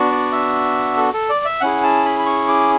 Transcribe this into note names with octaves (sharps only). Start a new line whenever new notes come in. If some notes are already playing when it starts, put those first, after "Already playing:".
Already playing: B3 D4 F#4
D5
E5
A4
A4
D5
E5
C#4 E4 G#4 F#5
A5
B5
B5
C#6
D6